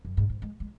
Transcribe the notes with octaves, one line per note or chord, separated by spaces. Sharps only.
F#2
G#2
G#2
G#3
G#3